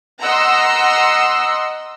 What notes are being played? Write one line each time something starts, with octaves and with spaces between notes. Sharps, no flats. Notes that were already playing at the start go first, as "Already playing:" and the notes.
D#5 F#5 A#5 C6 E6